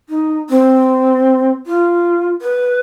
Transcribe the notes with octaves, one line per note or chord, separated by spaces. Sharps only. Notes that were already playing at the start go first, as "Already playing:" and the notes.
D#4
C4
F4
B4